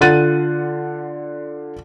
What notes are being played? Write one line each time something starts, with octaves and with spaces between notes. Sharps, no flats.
D3 F4 F#5 F#6 A6 D#7